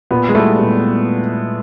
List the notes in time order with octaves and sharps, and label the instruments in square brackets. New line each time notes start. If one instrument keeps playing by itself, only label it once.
[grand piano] A#2 [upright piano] B3
[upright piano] G#3
[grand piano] G3 B3 E4 [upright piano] A3
[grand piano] A#2